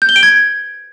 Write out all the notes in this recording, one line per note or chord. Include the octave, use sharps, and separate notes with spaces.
G6
G7
D7
G#6